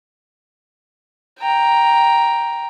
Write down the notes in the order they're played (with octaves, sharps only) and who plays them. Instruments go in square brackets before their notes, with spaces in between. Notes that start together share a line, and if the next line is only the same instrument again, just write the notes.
[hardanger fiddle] G5 A#5